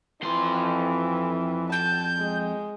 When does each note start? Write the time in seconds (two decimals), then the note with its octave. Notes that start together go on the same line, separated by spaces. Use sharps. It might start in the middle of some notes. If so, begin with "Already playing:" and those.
0.23 F2 E3 C6
1.72 A5 G6
2.18 G#3